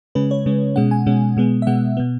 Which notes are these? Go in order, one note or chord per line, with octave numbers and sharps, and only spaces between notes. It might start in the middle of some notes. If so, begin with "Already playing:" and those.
C#3 G#3 C#4 B4
C#5
C#3 G#3 C#4
B2 G#3 C#4 F#5
G#5
B2 G#3 C#4
B2 G#3 B3
E5
B2 G#3 B3 F#5
B2 B3